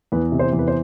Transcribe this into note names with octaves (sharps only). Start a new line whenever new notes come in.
E2 B4
C3
C5
E2
B4
C5